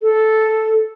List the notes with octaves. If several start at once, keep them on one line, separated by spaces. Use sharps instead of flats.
A4